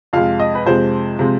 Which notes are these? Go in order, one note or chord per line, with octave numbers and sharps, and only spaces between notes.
F2 C3 F3 G#3 F5
D#5
B4
F2 C3 F3 G#3 C5
C3 F3 G#3